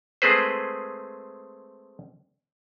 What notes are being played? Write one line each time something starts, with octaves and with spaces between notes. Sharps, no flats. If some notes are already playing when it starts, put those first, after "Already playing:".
G#3 A3 C4 G#4 B4 C5